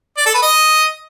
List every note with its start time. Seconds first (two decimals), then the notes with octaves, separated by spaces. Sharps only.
0.18 D5
0.26 A4
0.34 B4
0.43 D#5